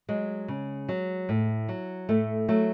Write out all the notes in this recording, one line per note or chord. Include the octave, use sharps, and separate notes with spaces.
F#3 G#3
C#3
F#3
A2
F#3
A2 A3
F#3 A3